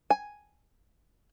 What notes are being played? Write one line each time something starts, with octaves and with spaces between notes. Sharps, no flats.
G#5